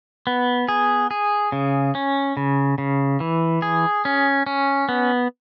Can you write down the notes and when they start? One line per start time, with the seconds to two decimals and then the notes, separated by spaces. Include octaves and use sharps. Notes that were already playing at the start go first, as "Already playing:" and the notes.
0.27 B3
0.68 G#4
1.11 G#4
1.52 C#3
1.95 C#4
2.37 C#3
2.78 C#3
3.20 E3
3.62 G#4
4.05 C#4
4.46 C#4
4.89 B3